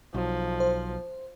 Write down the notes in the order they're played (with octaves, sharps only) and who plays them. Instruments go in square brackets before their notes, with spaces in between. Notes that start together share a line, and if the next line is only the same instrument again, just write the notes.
[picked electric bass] B1 [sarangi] F3
[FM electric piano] C5